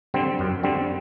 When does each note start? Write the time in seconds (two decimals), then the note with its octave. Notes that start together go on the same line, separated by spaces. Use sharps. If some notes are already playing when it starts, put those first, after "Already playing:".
0.14 D3 G3 C4
0.39 F#2
0.63 D3 G3 C4